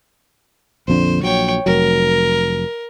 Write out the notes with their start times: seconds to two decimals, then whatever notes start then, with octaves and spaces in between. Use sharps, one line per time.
0.88 A#1 F2 D3 C5
1.23 A#1 F#3 C#5 G5
1.66 F1 F#3 A#4